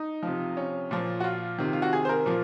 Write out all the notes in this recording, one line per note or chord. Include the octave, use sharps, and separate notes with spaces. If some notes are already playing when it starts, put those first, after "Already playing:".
Already playing: D#4
C3 F3
C#4
A#2 F3
F#4
F4
C3 D#3
F4
F#4
G#4
C5
A#4
A#2 F3